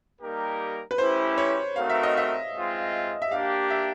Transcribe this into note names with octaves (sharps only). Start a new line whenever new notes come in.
G3 A#3 D#4 G4 A#4
B4
A3 C#4 E4 G4 C5
C#5
A3 C4 D#4 F#4 A#4 F5
E5
D#5
E5
G#3 C4 F4
E5
A#3 D4 G4 F5
E5